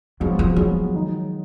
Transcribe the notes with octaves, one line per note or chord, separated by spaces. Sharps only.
F3 F#3 G#3 B3 F#4
F3
F3 F#3 G#3 B3 F#4
D#3 G#3 D#4